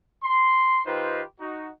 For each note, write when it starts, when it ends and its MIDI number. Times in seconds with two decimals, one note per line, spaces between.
0.23 0.80 84
0.86 1.21 51
0.86 1.21 63
0.86 1.21 65
0.86 1.21 67
0.86 1.21 71
0.86 1.21 72
1.39 1.68 63
1.39 1.68 66